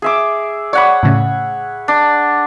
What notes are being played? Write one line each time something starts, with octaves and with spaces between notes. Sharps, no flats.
G#4 E5 D6
C#5 D5 F#5 B5
A2 C#3
D4